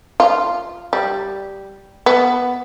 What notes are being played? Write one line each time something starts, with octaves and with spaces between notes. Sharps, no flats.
F4
G3
B3